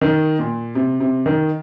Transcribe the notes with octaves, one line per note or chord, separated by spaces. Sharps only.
D#3
A#2
C3
C3
D#3